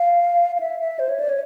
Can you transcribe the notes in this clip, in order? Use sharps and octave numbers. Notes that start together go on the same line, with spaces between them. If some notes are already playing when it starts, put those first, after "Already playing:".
Already playing: F5
F5
E5
E5
C5
C#5
D5
C#5